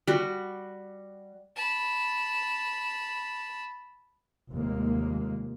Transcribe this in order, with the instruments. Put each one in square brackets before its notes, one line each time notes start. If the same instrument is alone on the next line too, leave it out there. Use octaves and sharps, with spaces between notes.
[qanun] G3 F#4
[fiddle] A5 B5
[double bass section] F1 D#2 G#3 A#3